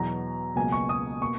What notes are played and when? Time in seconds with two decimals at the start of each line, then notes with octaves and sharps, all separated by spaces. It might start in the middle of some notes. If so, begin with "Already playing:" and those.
Already playing: E2 B2 F#3 A#5
0.56 C#2 B2 F#3 A#3 G#5
0.72 C#6
0.89 D#6
1.21 B2 A#3 C#6